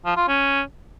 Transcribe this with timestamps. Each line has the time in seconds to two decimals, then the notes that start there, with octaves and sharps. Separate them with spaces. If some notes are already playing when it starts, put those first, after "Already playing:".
0.05 F3
0.17 F4
0.28 C#4